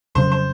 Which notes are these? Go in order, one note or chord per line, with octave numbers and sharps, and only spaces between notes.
F2 C#3 F#3 C5
C5